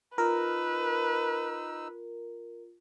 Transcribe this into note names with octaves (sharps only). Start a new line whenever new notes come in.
D#4 F4 A#4 B4 E6